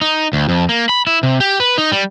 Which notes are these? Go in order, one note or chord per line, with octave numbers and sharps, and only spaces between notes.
D#4
D2
F2
A#3
B5
E4
C3
G4
B4
D#4
G3